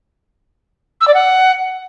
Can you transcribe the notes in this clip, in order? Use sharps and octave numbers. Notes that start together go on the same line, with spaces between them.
E6
D5
F#5